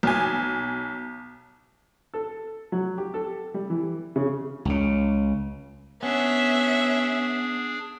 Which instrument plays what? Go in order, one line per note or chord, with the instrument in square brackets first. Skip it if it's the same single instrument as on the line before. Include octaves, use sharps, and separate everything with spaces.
[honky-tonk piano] B1 G#5
[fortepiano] A4
F#3
G4
A4
G3
E3
C#3
[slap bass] C#2 C#3
[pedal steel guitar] B3 [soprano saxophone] C#4 [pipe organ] D4 G#4 [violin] E5